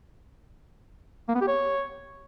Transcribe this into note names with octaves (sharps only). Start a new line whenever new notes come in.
A#3
B3
G4
C#5